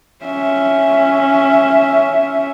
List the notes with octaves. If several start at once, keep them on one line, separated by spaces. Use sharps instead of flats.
C#4 E5